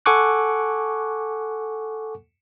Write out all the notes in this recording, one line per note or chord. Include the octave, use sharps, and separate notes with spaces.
A4 F#5 G#5 C#6 D6 F#6